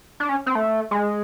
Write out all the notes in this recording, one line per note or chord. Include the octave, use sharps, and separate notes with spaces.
D4
C#4
C4
A3
G#3